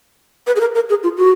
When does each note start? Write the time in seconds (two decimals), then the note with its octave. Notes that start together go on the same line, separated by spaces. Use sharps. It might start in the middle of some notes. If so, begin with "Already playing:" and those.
0.47 B4
0.56 G#4
0.60 A#4
0.75 A#4
0.90 G#4
1.03 F4
1.17 F#4